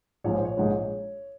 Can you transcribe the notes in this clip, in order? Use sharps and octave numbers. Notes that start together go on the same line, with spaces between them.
A#1 G#2 F3 G#3 C#5
C5
C#5
A#1 G#2 F3 G#3